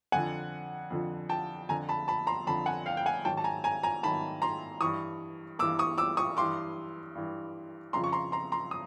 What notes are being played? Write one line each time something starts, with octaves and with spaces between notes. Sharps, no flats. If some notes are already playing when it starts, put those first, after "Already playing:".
F2 D3 F3 F#5 G#5
F2 D3 F3
G5 A5
F2 D3 F3 G#5 A#5
A5 B5
A5 B5
A#5 C6
F2 D3 F3 A5 B5
F#5 G#5
F5 G5
G5
F#5 G#5
G#2 D#3 F#3 G5 A5
A5
G#5 A#5
G#5 A#5
G#5 A#5
G#2 D#3 F#3 A5 B5
A#5 C6
G2 E3 C#6 D#6
G2 E3 D6 E6
C#6 D#6
D6 E6
C#6 D#6
G2 E3 C6 D6
G2 E3
F2 C#3 F3 A#5 C6
C#6
A#5 C6
A#5 C6
A#5 C6
D#6